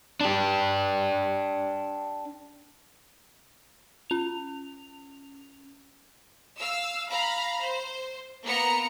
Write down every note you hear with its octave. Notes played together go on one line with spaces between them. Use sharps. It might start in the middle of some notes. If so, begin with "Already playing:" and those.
D4 G4
C#4 F7
F5 E6
F5 A#5 B5
C5
A#3 B3 A#5 C#7